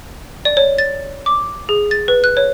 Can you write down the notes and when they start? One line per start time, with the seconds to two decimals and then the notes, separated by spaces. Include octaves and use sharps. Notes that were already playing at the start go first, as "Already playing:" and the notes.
0.45 D5
0.57 C#5
0.78 A6
1.26 D6
1.69 G#4
1.91 A6
2.08 B4
2.24 F#6
2.37 C#5